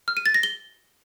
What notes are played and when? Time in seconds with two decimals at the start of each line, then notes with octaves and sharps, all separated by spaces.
0.08 F6
0.17 D#7
0.26 A6
0.34 A#6
0.43 G7